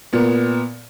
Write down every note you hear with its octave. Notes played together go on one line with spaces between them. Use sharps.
A#2 B3